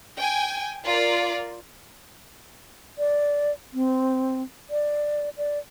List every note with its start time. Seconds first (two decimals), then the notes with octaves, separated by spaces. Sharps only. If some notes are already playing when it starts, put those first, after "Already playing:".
0.18 G5 G#5
0.86 F4 A#4 D5
2.98 D5
3.73 C4
4.70 D5
5.38 D5